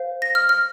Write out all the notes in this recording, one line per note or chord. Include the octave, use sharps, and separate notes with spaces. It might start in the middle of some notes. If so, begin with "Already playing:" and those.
Already playing: C5 F5
A#6
F6
F6